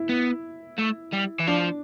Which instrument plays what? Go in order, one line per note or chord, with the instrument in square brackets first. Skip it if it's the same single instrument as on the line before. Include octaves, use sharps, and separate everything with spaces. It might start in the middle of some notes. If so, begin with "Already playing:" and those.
Already playing: [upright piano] E4
[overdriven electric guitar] B3
A3
G3
E3
[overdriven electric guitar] F3 [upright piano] D4